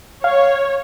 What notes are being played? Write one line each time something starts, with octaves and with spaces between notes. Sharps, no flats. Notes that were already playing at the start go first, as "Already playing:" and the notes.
C#5 F5